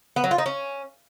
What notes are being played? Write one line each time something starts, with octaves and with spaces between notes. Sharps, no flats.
B3
F#3
F4
D#4
C#4